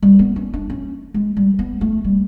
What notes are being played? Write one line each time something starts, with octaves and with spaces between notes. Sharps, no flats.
G3
B3
C#4
D4
C#4
G#3
G3
B3
A3
G3